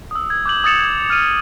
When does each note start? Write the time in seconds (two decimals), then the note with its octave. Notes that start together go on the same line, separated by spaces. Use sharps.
0.11 D#6 E6
0.30 G#6
0.46 D6 G6 F#7
0.64 D#6 E6 A6 C#7 E7 F7
0.79 G#6
1.10 F6 D#7